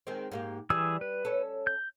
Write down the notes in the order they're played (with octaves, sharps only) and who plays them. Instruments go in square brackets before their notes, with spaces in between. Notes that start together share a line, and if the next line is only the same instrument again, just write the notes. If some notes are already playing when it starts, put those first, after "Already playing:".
[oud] D#3 G#3 C4
G#2 A#3 G4
[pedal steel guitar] E3 G#4 E6 [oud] G3
[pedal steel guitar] B4
[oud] C#4 A4
[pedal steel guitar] G6